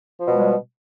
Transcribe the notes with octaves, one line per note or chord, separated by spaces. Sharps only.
B2 F3 G3 G#3